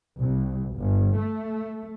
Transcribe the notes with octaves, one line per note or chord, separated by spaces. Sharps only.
C2
G1
A3